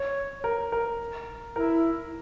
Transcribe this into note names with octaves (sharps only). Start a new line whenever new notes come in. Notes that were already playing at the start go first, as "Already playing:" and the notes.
Already playing: C#5
A#4
A#4
E4 A#4